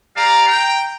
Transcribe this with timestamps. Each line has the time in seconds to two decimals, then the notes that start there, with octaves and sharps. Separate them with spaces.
0.17 G4 D5 F5 A#5
0.48 G5